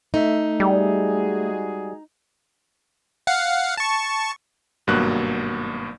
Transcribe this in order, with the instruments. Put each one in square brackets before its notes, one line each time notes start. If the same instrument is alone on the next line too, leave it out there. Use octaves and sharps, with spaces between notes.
[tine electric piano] A3 E5 [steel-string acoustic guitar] D#4
[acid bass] G3 [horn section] G#3 F#4 G#4
[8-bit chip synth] F5 F#5
A5 C#6
[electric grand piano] G#1 G2 B2 F#3 A#3 F#6